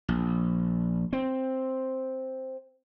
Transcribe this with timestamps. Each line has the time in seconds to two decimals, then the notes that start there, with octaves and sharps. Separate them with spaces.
0.09 A#1
1.13 C4